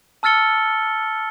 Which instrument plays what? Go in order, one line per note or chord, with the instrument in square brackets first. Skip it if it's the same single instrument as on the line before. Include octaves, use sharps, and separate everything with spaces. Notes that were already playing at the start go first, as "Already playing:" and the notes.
[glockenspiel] A5 E6 F6 A6 C#7 G7